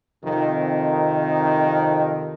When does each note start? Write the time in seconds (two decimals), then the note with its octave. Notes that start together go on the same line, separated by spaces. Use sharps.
0.24 F2 C3 D#3